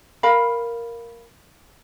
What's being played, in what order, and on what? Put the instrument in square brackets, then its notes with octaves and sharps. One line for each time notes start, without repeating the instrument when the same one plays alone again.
[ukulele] A#4 F5 B5